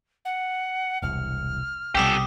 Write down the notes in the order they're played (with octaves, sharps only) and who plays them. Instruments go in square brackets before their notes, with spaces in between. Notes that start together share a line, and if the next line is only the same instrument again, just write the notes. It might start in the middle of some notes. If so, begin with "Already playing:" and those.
[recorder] F#5
[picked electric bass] E1 C2 [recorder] F6
[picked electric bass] B1 C3 G3 [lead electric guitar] G4 A4 [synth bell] G5 D6 D#6